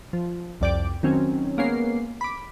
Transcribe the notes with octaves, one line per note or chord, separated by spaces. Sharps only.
F3
C2 F2 D5 G5 D7
D#3 F#3 C4 C#4
G#3 A#3 B3 C#4 C7
B5 D6